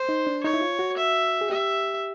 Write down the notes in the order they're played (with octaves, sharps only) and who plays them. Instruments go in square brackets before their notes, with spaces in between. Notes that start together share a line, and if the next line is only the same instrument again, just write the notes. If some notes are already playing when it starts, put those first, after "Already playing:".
Already playing: [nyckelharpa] C5
[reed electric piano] D#4
D4
[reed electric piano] D#4 [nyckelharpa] C#5
[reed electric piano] E4
F4
F#4
[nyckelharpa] E5
[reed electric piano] G#4
[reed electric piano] G4 [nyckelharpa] E5